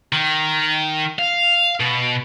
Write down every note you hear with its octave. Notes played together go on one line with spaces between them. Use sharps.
D#3
F5
B2